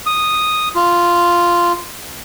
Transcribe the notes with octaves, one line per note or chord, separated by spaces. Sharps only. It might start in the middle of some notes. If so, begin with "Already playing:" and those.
D#6
F4